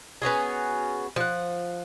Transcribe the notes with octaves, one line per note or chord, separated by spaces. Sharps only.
B3 C#4 F#4 G#4
F3 F#5